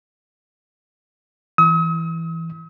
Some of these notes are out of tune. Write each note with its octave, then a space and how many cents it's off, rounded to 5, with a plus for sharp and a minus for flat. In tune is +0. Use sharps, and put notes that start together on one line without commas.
E3 +0 D#6 +45